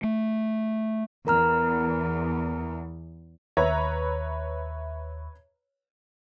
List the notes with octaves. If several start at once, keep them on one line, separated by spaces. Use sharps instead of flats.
A3
E2 A#4 A#5 F6
D#2 B4 C#5 E5 A#5